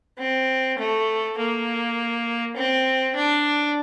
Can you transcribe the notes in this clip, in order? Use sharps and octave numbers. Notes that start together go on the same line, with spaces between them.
C4
A3
A#3
C4
D4